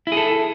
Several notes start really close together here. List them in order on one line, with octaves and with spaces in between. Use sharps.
E4 G#4 A4